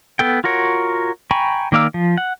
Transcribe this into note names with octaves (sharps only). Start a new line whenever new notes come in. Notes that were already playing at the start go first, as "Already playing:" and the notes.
B3 A4 G5
F4 F#4 A#4 C#5
G5 G#5 A#5 B5 C#6
D#3 A#3 D5 F5 E6
F3
F#5